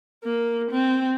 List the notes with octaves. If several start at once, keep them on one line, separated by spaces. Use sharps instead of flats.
A#3
C4